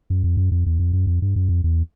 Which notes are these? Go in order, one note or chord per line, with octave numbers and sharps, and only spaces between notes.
F#2
F2
F#2
F2
E2
F2
F#2
F2
G2
F#2
F2
E2